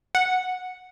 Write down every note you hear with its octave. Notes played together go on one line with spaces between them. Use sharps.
F#5